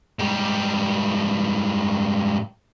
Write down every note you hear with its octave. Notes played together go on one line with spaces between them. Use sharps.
G#2 G3